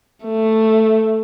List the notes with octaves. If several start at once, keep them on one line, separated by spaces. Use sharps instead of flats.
A3